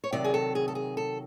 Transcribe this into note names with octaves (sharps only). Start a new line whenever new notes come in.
C#5
C3 D#3 F#3 D5
G#4
A4
G#4
A4
G#4
A4